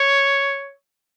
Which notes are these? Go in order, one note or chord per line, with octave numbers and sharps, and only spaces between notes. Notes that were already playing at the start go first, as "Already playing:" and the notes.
Already playing: C#5